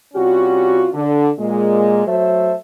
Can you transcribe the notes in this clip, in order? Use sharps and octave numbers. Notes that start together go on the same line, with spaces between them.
C3 G3 C#4 F4 F#4
D3
A#2 G#3
F#3 A3 A4 C5 E5